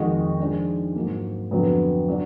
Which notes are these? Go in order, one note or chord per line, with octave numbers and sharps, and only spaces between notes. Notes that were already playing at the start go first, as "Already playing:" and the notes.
Already playing: F2 D#3 G#3 D#4 F#4
F3 G#3 D4
G#2 F#3 A#3
F2 D3 F#3 B3
F#3 D4